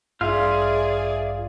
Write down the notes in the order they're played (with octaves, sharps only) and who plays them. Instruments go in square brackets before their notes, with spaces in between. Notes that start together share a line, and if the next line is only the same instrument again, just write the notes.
[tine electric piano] A1 G2 [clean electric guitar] F4 [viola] G#4 D5 [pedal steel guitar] E5 F5 F6